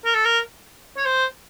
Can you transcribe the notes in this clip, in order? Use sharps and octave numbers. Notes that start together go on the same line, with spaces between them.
A#4
A4
A#4
C#5
C5